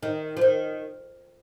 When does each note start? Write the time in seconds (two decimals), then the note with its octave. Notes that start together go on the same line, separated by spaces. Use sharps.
0.03 D#3
0.37 F3
0.41 D#3